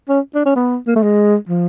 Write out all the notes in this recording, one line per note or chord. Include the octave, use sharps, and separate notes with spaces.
C#4
D4
C#4
B3
A#3
A3
G#3
F3